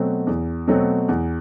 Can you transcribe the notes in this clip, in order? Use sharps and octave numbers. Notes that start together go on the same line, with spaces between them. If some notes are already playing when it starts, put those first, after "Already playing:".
Already playing: B2 F#3 A3 C4
E2
B2 F#3 A3 C4
E2